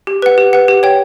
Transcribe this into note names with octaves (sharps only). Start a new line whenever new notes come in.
G4
B4 F#5
G4
B4 F#5
G4
C#5 G5